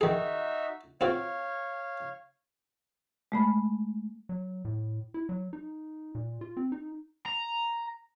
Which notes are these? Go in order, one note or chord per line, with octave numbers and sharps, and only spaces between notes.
D#3 D#4 F#4 G#4 E5
C4 F4 F#4 C#5 F5
G#3 A3 B5
F#3
A2
E4
F#3
D#4
A#2
F4
C4
D#4
A#5